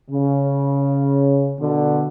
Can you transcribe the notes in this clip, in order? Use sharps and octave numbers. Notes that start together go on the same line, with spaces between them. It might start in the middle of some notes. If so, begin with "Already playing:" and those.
C#3
B2 D3